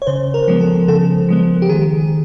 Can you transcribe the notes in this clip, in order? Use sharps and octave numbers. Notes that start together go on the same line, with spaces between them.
C#5
C#3 C5
A#4
F3 G#3 B3
A4
C#3 A4
F3 G#3 B3
G4
D#3 G#4